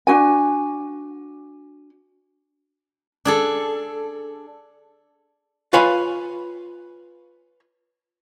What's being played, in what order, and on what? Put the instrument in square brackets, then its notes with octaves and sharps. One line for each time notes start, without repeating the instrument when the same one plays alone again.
[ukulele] D4 D#4 F#4 G#5
[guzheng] D4 G#4 A4
[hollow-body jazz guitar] F4 B4 C#5 F5 G#5 B5